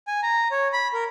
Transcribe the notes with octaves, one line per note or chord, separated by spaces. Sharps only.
G#5
A#5
C#5
B5
A#4